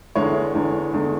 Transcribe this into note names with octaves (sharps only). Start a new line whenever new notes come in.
E2 D3 G#3 C#5
E2 D3 G#3
E2 D3 G#3